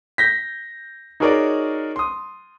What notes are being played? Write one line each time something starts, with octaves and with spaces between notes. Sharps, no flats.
G6 A#6 B6
D#4 F#4 G#4 A#4 C#5 D5
C6 D#6